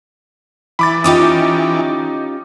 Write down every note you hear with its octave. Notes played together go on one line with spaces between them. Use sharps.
E3 B5 D6 A6
C#4 D#4 F4 G4 D6 D#6